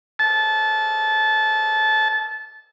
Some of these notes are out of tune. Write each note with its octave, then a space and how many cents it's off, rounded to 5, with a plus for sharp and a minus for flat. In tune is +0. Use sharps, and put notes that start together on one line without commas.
A5 -20